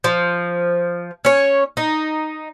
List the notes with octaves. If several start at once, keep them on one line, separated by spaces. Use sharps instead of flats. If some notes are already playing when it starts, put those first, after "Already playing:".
F3
C#4 C#5
D#4